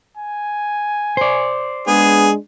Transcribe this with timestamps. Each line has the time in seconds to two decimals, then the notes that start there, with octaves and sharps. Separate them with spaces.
0.17 G#5
1.17 C5 D5
1.87 G#3 B3 D4 G#4